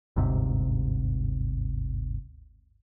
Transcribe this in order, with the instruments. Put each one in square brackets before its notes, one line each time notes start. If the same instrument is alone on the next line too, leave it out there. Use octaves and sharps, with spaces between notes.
[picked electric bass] G1 D2 G#2 C3